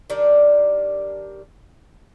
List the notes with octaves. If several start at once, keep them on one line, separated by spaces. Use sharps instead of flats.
D#3 G3 D4 D5